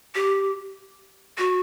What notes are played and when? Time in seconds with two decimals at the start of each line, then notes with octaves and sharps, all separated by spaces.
0.15 G4
1.38 F#4